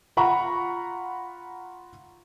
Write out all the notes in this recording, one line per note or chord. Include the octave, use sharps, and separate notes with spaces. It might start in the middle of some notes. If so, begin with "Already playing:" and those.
F4 F#5 A#5 B5 C#6